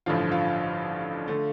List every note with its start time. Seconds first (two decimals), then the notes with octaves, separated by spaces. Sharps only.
0.06 A1 G2 D3 F3 F4
0.32 F4
1.28 D3 A3